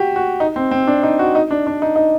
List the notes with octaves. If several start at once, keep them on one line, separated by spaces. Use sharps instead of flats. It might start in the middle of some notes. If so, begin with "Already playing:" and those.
Already playing: F#4 G4
F#4
D#4
C4
C4
D4
D#4
F#4
D#4
D4
D4
D#4
D#4